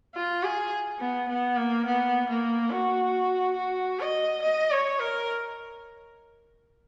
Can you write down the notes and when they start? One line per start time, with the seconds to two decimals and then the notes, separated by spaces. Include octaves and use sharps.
0.15 F4
0.43 G#4
1.00 B3
1.29 B3
1.57 A#3
1.86 B3
2.29 A#3
2.71 F#4
3.57 F#4
4.01 D#5
4.42 D#5
4.71 C#5
4.99 A#4